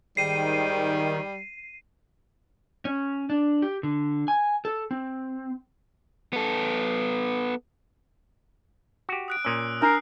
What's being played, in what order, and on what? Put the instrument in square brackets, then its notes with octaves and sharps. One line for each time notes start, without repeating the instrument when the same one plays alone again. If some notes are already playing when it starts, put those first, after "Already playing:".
[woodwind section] G#2 G5 [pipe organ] D#3 [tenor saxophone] G3 [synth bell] C7 D#7
[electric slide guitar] C#4
D4
G4
D3
G#5
A4
C4
[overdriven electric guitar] B3 A4
[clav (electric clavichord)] F#4 G4
[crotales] D#6 F#6 D7
[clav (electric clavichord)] A#2 C#4 [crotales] D#6 E6
[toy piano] D4 A#5 [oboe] A#4 [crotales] F#6 C7